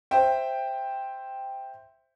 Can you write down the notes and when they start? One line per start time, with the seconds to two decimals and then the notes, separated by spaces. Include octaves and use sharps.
0.11 C5 E5 G5